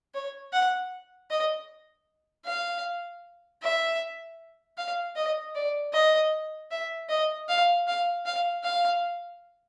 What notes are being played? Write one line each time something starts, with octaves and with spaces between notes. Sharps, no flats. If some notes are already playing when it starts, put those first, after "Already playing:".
C#5
F#5
D#5
F5
E5
F5
D#5
D5
D#5
E5
D#5
F5
F5
F5
F5